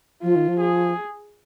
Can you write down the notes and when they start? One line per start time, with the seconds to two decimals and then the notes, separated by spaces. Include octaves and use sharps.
0.22 F3 F4
0.36 D#3
0.48 F3
0.60 G#4